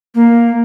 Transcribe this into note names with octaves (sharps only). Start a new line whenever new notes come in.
A#3